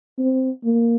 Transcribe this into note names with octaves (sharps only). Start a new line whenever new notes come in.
C4
A#3